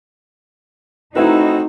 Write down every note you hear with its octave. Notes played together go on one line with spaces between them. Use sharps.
A3 C4 D#4 E4 F#4 B4